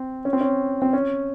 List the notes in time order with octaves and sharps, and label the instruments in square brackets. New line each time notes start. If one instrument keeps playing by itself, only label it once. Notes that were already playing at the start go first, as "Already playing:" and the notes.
Already playing: [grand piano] C4
C#4
C4
C#4
C4
C#4